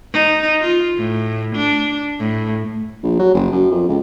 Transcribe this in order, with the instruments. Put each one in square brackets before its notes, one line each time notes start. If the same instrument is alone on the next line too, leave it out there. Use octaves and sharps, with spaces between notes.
[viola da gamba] D#4
F4
A2
D4
A2
[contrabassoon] A#1
F#3
F#1
F#2
F2
C#2